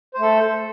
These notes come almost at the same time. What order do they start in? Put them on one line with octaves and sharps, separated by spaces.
C5 A3 A4